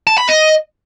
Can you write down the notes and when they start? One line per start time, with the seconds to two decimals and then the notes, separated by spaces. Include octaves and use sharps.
0.07 A5
0.18 B5
0.29 D#5